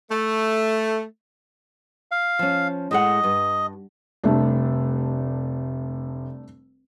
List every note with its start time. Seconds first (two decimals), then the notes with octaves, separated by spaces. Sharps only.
0.11 A3
2.12 F5
2.39 F3 C#4
2.91 A2 G#3 D#5 F#5
3.24 G2
4.24 F1 G3 A3 D4